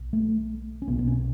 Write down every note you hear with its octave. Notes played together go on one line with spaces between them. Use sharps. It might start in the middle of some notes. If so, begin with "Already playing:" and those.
Already playing: B1 B2
A3
C#4
B1 B2 B3
B3
C#4